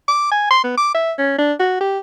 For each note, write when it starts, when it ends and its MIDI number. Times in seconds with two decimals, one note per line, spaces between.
0.08 0.31 86
0.31 0.48 80
0.51 0.61 84
0.64 0.73 59
0.77 0.90 86
0.95 1.13 76
1.18 1.37 61
1.39 1.53 62
1.60 1.76 66
1.81 1.99 67